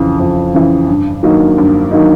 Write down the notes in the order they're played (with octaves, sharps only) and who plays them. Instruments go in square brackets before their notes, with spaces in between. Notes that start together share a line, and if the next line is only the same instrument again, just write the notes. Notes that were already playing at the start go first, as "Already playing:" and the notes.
Already playing: [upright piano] F2 C#3 E3
F2
C#3 E3
G2
D#3 F#3 A#3 D#4
G2
D#3 F#3 A#3 D#4